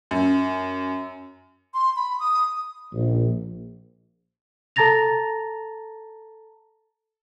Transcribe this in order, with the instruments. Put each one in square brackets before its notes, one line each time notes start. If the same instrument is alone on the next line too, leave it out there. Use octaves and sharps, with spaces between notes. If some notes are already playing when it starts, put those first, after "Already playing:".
[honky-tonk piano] F#2
[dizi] C6
B5
D#6
[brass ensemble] A#1
[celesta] A4 A5 A#5 A6 A#6 F7